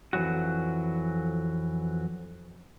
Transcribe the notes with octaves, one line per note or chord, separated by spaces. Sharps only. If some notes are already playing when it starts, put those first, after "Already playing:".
F2 E3 F#3 F#4